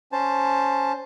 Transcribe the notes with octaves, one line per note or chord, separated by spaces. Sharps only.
C#4 C5 A5